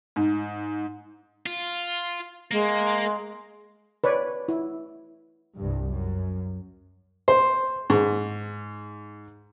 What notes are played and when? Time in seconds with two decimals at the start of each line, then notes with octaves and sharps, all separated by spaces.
0.16 G#2
1.46 F4
2.51 G#3 A#3
4.04 B4 C#5 D5
4.48 E4
5.57 C2 G2
5.90 F#2
7.28 C5
7.90 G#2